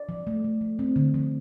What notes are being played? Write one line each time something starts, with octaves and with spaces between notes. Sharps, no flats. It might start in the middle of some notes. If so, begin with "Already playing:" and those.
Already playing: D5
F3
A3
A3
F3
C4
D3
F3